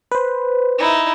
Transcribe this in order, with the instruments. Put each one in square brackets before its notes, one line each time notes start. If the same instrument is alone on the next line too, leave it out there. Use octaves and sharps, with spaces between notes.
[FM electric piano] B4 C5
[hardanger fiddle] D#4 E4